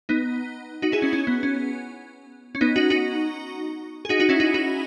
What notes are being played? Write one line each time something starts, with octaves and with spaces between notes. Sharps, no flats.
B3 D#4
D#4 F#4
E4 G#4
C#4
C#4
B3
C#4
C#4
B3 D#4
D#4 F#4
D#4 F#4
G#4
D#4 F#4
D#4 F#4
C#4 E4
D#4 F#4
D#4 F#4